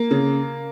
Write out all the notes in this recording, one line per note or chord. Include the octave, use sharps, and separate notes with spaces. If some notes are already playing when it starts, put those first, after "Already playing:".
Already playing: A#3
C#3